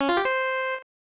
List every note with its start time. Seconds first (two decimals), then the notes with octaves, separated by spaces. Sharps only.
0.01 C#4
0.09 F4
0.17 G4
0.25 C5